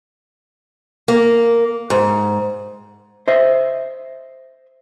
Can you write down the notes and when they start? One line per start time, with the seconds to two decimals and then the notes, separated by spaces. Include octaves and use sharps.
1.08 A#3
1.90 G#2
3.28 C5 D#5 E5